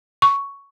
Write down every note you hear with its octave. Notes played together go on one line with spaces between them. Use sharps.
C#6